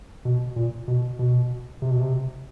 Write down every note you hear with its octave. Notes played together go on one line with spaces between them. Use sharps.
B2
A#2
B2
B2
C3
B2
C3